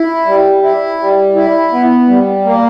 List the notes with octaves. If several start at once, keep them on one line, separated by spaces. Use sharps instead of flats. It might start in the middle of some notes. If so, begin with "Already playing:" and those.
Already playing: E4
G3
E4
G3
E4
B3
G3
A#3